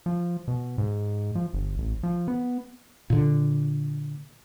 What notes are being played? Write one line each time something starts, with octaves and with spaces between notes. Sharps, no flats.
F3
B2
G#2
F3
G1
A1
F3
B3
A#2 D3